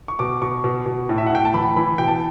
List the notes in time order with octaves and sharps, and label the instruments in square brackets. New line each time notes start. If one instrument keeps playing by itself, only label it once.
[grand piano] C#6
B2 D6
B2 C#6
B2
B2
A2
E5
F#5
A2 G5
A5
E3 B5
E3 B5
B2 G5
A5